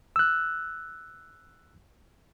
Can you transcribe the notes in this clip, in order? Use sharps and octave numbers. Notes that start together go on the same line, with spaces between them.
E6 F#6